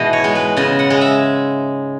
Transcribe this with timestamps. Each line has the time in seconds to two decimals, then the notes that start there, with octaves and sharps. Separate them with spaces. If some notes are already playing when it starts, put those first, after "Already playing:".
Already playing: G#2 B2 E3 D#5
0.13 C#5
0.24 G#3
0.35 B4
0.57 C#3 D#5
0.79 F#5
0.90 G#3
1.01 E5